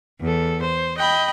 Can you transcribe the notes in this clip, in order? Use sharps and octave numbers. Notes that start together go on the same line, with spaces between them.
E2 A4
C5
D#5 G5 B5